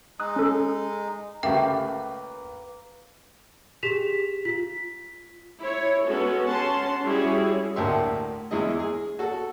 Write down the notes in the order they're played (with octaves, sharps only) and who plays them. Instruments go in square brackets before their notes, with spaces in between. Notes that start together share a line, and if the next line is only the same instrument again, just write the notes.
[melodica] G#3 D#4 [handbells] D#6 F#6
[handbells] C#4 A4
[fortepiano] C#2 A3 G4 [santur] A#3 B4 [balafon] E5 [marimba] G5
[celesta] G4 G#4 B6 E7 F7
F4 B6
[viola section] E4 C#5
G#3 B3 C#4 F#4 A4
C#4 F#5 A5 C6
G3 C#4 E4 F#4 G#4 C#5
[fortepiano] D2 A2 A#3 G4 E5 C6
E2 G#3 E4 G#4 D#5
G#4
F#4 A4